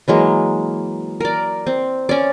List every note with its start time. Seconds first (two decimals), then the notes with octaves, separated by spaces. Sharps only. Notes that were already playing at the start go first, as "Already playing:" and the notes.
0.08 E3 F#3 G#3 A#3
1.20 A#4 D5
1.66 C4
2.09 C#4 D5